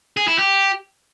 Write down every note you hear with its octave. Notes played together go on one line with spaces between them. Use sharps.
G#4
E4
G4